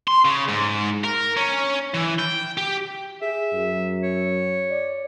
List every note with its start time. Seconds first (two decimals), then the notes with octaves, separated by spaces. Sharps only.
0.08 C6
0.25 C#3
0.48 G#2
1.04 A#4
1.37 C#4
1.94 E3
2.19 G5
2.57 G4
3.22 G#4 E5
3.53 F#2
4.03 C#5
4.71 D5